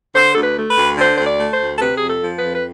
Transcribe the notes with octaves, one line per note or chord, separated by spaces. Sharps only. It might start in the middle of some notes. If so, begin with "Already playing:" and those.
D3 C5
D2 A4
B4
A3
B4
D2
D3 C5
D2 C5
D5
A3
C5
D2
A4
C3 B4
G#4
F2
A4
F3
B4
F2
B4